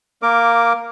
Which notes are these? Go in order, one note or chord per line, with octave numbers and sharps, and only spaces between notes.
A#3 A#4 D6